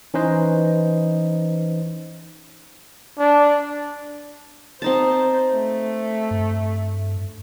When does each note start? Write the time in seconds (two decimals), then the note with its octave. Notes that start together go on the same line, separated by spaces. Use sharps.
0.14 E3 C#4 D#4 B4 C5 D#5
3.19 D4
4.82 C4 D#4 C5 A5
5.53 A3
6.31 G2